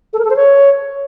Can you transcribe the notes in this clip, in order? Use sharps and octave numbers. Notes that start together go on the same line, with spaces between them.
A4
A#4
A4
C5
C#5